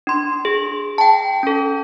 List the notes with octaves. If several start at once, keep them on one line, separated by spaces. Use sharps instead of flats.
D4 C6
G#4
G5 A5
C#4 A4